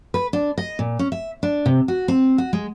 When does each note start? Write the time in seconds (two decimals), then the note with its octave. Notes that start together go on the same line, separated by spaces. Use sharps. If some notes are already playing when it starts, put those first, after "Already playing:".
0.14 B4
0.33 D4
0.58 D#5
0.79 A#2
0.99 C#4
1.12 E5
1.43 D4
1.66 C3
1.88 F#4
2.08 C4
2.38 F#4
2.53 G#3